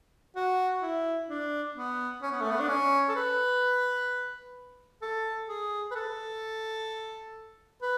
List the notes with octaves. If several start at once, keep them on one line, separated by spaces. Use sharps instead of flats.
F#4
E4
D4
B3
C#4
B3
A3
B3
D4
C#4
A4
B4
A4
G#4
B4
A4
B4